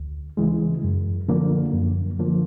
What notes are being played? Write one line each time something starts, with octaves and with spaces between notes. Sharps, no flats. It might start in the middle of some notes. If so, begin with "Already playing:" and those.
Already playing: D2
C#3 E3 G#3
F#2
D3 F3 A#3
F#2
D3 F3 A#3